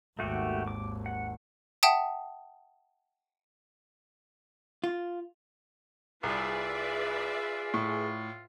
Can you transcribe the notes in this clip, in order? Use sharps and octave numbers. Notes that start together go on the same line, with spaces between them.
G#1 D#2 A3 F#4 G4
D6
F#5
E5 F#5 G5 A5 D#6
F4
C2 F4 G#4 B4 D5 E5
A2